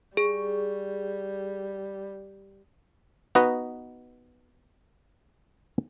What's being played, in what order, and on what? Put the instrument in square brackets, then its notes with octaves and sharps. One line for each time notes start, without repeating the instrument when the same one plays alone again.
[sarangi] G3 [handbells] G#4
[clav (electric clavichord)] B3 D#4 F#4 B4 D#5